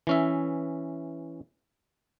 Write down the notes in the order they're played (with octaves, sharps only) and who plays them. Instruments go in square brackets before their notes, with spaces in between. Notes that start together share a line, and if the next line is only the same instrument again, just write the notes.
[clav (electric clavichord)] E3 C#4 E5